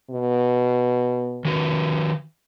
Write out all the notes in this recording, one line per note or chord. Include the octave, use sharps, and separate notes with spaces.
B2
D#3 F#4 B4